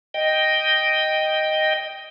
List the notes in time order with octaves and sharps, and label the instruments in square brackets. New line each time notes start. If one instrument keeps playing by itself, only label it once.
[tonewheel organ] D#5 G5